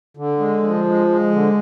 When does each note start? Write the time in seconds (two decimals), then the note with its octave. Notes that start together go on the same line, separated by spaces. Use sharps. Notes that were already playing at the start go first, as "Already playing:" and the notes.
0.17 D3
0.39 G#3
0.63 F3
0.84 G#3
1.07 G#3
1.31 D3